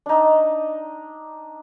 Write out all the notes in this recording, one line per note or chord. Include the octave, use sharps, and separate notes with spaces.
D4 D#4